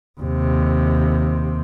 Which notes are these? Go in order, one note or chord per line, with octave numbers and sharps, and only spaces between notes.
D#2 C3